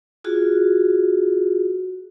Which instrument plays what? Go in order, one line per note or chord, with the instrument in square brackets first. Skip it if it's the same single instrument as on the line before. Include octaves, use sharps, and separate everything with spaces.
[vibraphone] F4 F#4 G#4